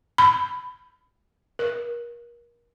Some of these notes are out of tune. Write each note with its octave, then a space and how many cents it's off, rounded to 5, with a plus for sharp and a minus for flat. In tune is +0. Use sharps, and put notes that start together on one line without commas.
B5 +20
A#4 +30